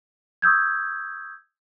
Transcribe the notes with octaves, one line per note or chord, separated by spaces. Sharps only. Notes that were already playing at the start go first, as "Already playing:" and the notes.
C#6 D#6 E6 G6 G#6